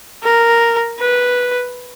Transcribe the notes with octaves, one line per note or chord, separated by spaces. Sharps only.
A#4
B4